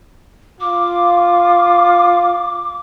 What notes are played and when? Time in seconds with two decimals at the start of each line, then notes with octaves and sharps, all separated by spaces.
0.60 F4 D6